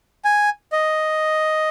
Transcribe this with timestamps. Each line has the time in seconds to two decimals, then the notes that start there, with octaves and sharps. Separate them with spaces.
0.25 G#5
0.73 D#5